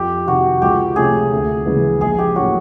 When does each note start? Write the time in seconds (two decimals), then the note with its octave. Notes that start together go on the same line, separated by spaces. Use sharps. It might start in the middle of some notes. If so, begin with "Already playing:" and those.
Already playing: F2 G4
0.26 C3 D#3 F#4
0.62 C#2 G4
0.96 C3 F3 A3 C#4 G#4
1.32 D2
1.66 C#3 E3 G#3 B3
2.01 A#1 G#4
2.19 G4
2.36 A2 F#3 A#3 C#4 F#4